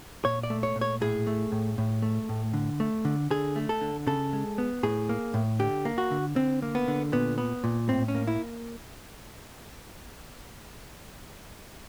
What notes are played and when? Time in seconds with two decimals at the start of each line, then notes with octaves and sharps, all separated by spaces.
0.25 A#2 C#5
0.43 D5
0.50 A3
0.63 C#5
0.76 A#2
0.81 C#5
1.01 A2 G#4
1.27 A3
1.52 A2
1.78 A2
2.02 A3
2.29 A2
2.53 D3
2.80 A3
3.05 D3
3.31 D3 G#4
3.56 A3
3.69 A4
3.81 D3
4.07 C#3 A4
4.33 G#3
4.58 B3
4.83 A2 G#4
5.09 A#3
5.34 A2
5.59 D3 G4
5.85 A#3
5.98 F#4
6.11 D3
6.36 D3 C4
6.62 A#3
6.75 B3
6.88 D3
7.12 A#2 B3
7.38 B3
7.64 A#2
7.89 A2 C4
8.08 C#4
8.15 A#3
8.28 E4